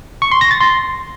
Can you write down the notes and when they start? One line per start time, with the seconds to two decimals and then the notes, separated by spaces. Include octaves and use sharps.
0.22 C#6
0.31 C6
0.41 A#6
0.51 A6
0.60 C6